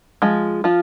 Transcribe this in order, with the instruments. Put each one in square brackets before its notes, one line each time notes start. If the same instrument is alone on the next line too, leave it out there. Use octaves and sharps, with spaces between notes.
[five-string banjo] F3 G#3
F3 F4